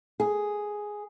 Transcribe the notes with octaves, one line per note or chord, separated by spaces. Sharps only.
G#4